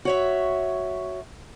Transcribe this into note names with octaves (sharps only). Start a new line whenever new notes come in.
F#4 C#5 E5